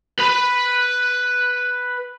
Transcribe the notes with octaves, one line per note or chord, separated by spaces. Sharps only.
B4 B5